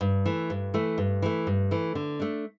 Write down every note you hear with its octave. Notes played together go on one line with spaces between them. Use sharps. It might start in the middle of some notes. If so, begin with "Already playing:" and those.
G2
E3 A3
G2
E3 A3
G2
E3 A3
G2
E3 A3
D3
A3 D4